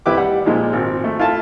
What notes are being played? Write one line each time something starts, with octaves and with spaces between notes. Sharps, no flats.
F2 A3 E4 G4 B4 D6
G3 F#5
A#2 F3 G#3 D#4
G#1 C4
A3
E4 F4 A4 E5 A5